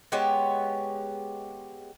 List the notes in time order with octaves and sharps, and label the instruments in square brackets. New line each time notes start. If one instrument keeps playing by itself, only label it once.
[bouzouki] G#3 B3 G4 C#5